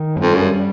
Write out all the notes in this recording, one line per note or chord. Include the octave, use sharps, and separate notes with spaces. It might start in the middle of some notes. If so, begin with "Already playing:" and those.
Already playing: D#3
G2
F2
F#2 G3